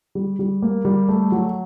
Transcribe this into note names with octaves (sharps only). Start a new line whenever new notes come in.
G3
G3
A#3
G3
A3
F#3